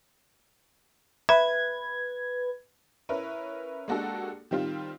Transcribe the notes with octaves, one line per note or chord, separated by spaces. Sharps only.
B4 E5 G#6
C#4 E4 A#4 B4
G#3 A#3 D4 F#4 G4 A4
D#3 G3 C4 F4